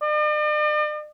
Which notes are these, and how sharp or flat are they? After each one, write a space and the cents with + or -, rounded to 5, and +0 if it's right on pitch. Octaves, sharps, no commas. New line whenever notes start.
D5 +45